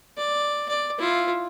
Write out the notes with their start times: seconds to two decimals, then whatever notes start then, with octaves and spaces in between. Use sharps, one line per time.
0.17 D5
0.69 D5
0.99 E4 F4